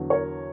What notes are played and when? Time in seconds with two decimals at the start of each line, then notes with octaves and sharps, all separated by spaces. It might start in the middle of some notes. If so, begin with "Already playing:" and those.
Already playing: E2 D3 F#3
0.10 A#4 C#5